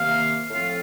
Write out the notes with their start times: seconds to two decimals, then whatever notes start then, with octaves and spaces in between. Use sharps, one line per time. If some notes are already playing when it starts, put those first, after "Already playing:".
Already playing: C3 D#3 A#3 F5
0.50 A2 F3 C4 F4 F5